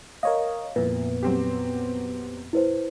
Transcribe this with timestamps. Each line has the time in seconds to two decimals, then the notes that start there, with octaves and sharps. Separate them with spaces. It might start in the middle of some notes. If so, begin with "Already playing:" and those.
0.23 A#4 C#5 D#5 F5
0.76 C2 F2 A#2 B3 B4
1.23 F#3 C4 G4
2.53 E4 B4 C5